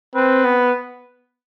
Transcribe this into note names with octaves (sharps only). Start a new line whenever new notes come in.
C4 B4
B3